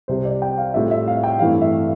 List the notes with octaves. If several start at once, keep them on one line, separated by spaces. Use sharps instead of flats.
C2 C3 G3 C5
D5
G5
F5
A2 G3 C4 F4 E5
E5
F5
G5
G2 E3 A3 C4 E4 F5
E5